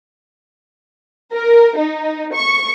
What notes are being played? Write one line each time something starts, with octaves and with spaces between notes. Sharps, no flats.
A#4
D#4
C#6